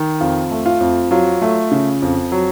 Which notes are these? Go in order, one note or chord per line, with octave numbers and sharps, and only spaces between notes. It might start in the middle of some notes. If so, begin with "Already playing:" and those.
Already playing: D#3
F2 F4
A3
F4
F2
F#3 F4
A3
C#3
F2
F#3